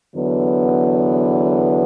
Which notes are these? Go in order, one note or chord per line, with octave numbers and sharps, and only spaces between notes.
E2 D3 F#3 B3